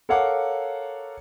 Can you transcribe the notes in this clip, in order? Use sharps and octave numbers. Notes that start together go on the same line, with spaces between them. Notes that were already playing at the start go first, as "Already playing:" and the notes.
A4 A#4 C#5 F5 F#5 D6